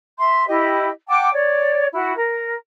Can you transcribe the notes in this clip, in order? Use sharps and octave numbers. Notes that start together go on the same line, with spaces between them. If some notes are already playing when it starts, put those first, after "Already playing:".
E5 C6
E4 G4 D#5
F#5 G5 A5 D6
C#5 D5
E4 F#4
A#4